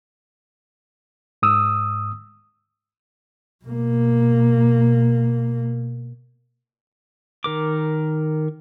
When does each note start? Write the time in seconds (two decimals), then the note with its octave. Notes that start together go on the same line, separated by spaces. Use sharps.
1.42 G#2 D#6 E6
3.65 B2 A#3
7.44 D#3 A#4 D6